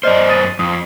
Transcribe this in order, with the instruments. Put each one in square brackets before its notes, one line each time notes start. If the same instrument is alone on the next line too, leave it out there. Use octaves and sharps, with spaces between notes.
[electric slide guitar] F#2 C5 [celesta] D5 D#5 F6
[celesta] D#6 A6 D#7
[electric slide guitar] F2 [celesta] D#6